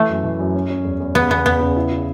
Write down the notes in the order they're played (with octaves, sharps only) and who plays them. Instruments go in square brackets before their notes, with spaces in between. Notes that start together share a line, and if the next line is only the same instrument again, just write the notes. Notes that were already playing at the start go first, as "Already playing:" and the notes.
Already playing: [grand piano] E3 [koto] A3
[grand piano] F#2
E3
F#2
C#4
C#4
E2
E2
[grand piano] C#3 [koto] B3
[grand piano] E2 [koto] B3
[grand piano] E2 [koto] B3
[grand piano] C#3
E4
E4